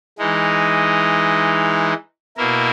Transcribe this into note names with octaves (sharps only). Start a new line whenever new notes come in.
E3 G#3 D#4
B2 A#3 E4 A#4